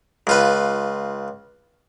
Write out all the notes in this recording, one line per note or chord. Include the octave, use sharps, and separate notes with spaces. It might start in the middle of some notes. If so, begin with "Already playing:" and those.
C#2 F4 B4